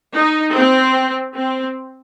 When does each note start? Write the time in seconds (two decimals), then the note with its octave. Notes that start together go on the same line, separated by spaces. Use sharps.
0.14 D#4
0.54 C4
1.36 C4